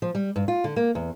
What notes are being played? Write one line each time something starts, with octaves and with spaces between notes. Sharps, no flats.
F3
G3
G2
F4
D3
A#3
E2